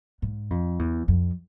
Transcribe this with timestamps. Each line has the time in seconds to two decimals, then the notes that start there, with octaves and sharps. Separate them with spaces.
0.22 G#2
0.50 F2
0.79 E2
1.08 F2